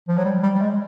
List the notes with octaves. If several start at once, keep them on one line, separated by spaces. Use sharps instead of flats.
F3
F#3
G3
G3
G3
G#3